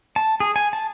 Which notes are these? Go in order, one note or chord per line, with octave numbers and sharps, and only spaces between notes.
A5
G#4
G#5
A5